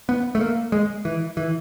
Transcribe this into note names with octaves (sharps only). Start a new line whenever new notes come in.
B3
A3
A#3
G#3
E3
E3